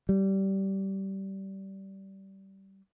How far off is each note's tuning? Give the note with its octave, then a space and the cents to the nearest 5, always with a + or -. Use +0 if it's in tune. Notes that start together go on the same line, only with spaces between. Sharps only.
G3 -20